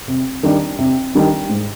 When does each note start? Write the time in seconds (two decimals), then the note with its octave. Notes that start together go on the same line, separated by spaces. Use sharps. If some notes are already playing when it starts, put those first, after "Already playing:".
0.08 C3
0.43 D#3 G3 D4
0.79 C3
1.15 D#3 G3 D4
1.49 G#2